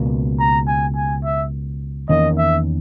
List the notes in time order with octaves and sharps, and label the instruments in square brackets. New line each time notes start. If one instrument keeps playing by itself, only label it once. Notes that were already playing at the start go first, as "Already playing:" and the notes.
Already playing: [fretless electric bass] C#2 B2 A#3
[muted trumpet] A#5
G#5
G#5
E5
[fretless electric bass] E2 D#3 A#3 C#4 [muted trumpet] D#5
[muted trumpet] E5